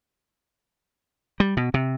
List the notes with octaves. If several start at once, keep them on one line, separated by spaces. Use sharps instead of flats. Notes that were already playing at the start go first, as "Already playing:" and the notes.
G3
B2
C3